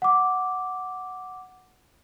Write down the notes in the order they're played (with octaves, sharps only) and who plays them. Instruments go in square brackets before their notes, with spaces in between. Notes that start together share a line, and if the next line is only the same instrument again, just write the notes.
[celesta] F#5 D6